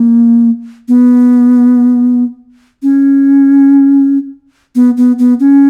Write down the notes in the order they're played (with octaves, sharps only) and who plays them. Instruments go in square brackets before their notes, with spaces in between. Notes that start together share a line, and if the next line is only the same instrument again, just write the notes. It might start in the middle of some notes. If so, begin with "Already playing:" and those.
Already playing: [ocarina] A#3
B3
C#4
B3
B3
B3
C#4